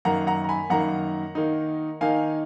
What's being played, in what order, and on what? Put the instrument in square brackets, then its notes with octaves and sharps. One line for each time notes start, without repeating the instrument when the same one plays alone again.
[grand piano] F#2 D#3 A#3 F#5 A#5
F#5 A#5
A#5
G#5 B5
F#2 D#3 A#3 F#5 A#5
D#3 A#3 D#4
D#3 A#3 D#4 F5 G#5